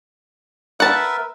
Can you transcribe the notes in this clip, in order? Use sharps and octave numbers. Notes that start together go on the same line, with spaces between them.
A#4 B4 E5 F#5 A5